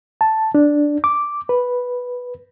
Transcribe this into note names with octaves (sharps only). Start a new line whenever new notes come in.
A5
D4
D6
B4